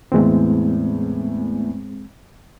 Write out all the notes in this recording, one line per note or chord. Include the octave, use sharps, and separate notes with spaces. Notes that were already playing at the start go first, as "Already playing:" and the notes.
E2 A2 E3 G#3 C4